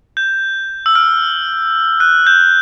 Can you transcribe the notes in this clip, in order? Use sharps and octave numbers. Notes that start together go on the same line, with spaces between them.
G6
E6
F6
F#6
G6